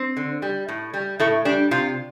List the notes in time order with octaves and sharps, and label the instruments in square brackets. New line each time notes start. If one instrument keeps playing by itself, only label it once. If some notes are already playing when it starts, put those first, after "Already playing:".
Already playing: [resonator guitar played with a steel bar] C4
D3
G3
A2
G3
A2 A3
G3 D4
C3 F4